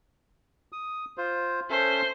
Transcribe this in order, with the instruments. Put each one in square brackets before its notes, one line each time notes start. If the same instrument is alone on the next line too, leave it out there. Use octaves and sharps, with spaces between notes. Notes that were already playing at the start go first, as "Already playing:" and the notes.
[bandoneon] D#6
F4 C5
[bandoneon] C#4 A4 E5 [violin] C5